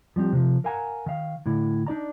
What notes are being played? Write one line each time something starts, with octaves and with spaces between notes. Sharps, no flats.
F3 G3 C4 G4
C3 F3
A#4 F5 F#5 G#5 A#5
D#3 F5
A2 D3 E4
D4 D#4 D5 A#5